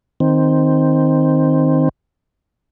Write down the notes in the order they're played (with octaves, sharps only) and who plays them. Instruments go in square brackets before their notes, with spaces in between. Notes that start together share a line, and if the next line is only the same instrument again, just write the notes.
[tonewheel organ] D#3 C4